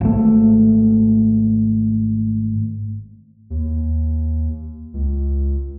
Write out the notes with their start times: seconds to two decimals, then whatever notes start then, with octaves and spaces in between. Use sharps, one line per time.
0.01 G#1 A3
3.50 D#2
4.93 C#2